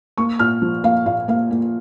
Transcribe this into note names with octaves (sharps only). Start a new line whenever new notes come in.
A#3 C#6
A#2 F6
F3
A#3 F5
A#2 F5
A#3 F5
A#3